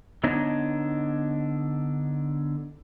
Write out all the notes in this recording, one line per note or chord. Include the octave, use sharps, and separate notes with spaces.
D3 B3 D4 D#4 C#5 D#5